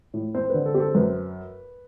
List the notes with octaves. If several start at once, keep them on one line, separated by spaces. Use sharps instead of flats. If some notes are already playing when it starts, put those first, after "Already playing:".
A2
C4 C5
D3 B4
A4
C4 G4
A4
F#2 B4